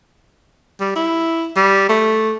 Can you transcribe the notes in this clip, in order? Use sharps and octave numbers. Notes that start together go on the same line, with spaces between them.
G3
E4
G3
A3